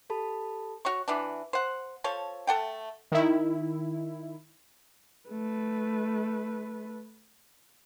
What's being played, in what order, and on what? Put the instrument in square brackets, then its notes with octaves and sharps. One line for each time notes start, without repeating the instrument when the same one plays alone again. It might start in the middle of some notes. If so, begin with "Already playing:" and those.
[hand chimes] G4 A4 A5 B5
[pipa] F#4 C#5 C#6
E3 B3 D4
C5 F#5
F3 A4 C#5
A3 A4 F#5 G5
[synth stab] D#3 E4
[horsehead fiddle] A3 B4